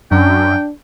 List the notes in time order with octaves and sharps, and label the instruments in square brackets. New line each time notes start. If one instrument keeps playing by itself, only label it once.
[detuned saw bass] F#2 [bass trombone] D4 [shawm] G5